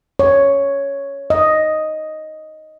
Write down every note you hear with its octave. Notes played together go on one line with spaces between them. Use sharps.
C#5
D#5